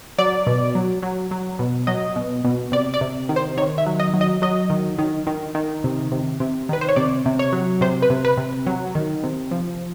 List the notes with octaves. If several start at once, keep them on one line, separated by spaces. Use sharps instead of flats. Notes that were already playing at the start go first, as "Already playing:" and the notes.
F#3 D5
B2
F#3
F#3
F#3
B2
F#3 D#5
B2
B2
C3 D5
D5
C3
D#3
C5
D#3 C#5
E5
F#3
D#5
F#3
D#5
F#3 D#5
D#3
D#3
D#3
D#3
C3
C3
C3
D#3 B4
C5
C#5
C3 D5
C3
C#5
F#3
C3 C5
B4
C3
B4
C3
F#3
D#3
C3
F3